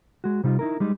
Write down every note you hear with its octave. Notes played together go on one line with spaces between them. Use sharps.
G#3 F#4
C3 G3 D#4 F4
D#4 E4 A#4
G3 G#3 D#4